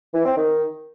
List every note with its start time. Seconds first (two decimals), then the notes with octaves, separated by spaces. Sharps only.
0.14 E3
0.26 C4
0.37 D#3